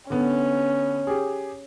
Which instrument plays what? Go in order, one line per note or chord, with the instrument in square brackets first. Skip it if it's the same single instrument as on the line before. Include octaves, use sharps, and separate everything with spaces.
[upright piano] D3 B3 [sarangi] C#4
[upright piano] G4 G#4